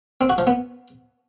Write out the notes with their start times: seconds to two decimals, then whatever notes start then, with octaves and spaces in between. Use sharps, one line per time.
0.21 C4
0.30 F#4
0.38 F3
0.47 B3